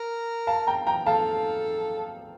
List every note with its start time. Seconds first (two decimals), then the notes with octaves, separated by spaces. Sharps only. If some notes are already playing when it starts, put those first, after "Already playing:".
Already playing: A#4
0.47 F5 A5
0.67 G5 A#5
0.87 G5 A#5
1.06 A4 F5 A5